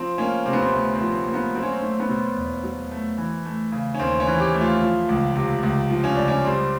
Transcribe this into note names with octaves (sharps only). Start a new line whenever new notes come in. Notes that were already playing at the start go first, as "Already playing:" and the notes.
Already playing: F3 C4
A#3 C#4
C3 C4
B3
C4
D2 C4
C4
F3
C4
A#3
B3
F#3 C4
C#4
C4
A3 C#4
B3
B2 C4
E2
F#3
A3
E3
A3
C#3
C#4
D#2 C4
C#4
E3
G4
A3
F4
F3
C#2
C3
C#2
F3
C#4
C#2 D4
C#4
G3 C4